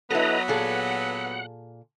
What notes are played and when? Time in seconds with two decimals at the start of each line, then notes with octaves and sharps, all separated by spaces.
0.11 F#3 B3 E4 A4 B4 D#5 A#5
0.48 A#2 G#4 A4 F#5